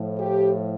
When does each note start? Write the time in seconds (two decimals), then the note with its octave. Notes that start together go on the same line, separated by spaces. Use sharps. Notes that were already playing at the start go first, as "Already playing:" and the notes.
Already playing: A2 F3
0.19 G4